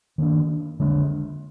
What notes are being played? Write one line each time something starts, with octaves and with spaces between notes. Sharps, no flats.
D#3 A#3 D4
D3 G#3 D4